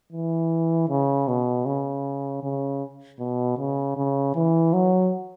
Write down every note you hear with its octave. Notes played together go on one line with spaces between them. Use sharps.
E3
C#3
B2
C#3
C#3
B2
C#3
C#3
E3
F#3